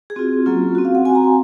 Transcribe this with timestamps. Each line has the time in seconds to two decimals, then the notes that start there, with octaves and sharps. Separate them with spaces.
0.10 G#4
0.16 C4 F4 F#4
0.46 F#3 A#3 C#4 F4
0.75 F#4
0.78 C4
0.85 F5
0.95 F#5
1.05 C4 G#5
1.10 F#4
1.15 A#5
1.24 C6